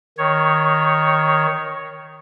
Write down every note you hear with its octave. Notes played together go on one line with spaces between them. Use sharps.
D#3 C#5